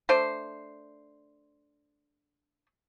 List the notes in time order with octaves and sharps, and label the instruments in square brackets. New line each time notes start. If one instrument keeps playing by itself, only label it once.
[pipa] A3 D4 C5